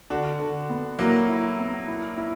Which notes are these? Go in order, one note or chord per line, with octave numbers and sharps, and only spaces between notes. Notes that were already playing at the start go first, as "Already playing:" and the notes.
D3 D4 F#4
D3
B3
F#3 A#3 E4
E4
B3
E4
E4